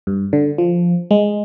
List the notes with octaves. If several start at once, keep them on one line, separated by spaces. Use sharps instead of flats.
G2
D3
F3
G#3